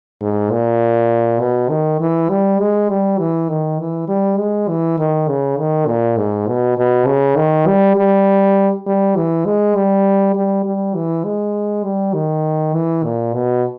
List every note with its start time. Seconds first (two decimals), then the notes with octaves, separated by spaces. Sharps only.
0.22 G#2
0.51 A#2
1.40 B2
1.70 D#3
2.01 E3
2.30 G3
2.60 G#3
2.89 G3
3.19 E3
3.49 D#3
3.80 E3
4.08 G3
4.38 G#3
4.69 E3
4.99 D#3
5.28 C#3
5.58 D#3
5.87 A#2
6.17 G#2
6.48 B2
6.78 B2
7.07 C#3
7.36 D#3
7.67 G3
7.96 G3
8.87 G3
9.16 E3
9.46 G#3
9.76 G3
10.35 G3
10.65 G3
10.95 E3
11.25 G#3
11.84 G3
12.14 D#3
12.74 E3
13.04 A#2
13.34 B2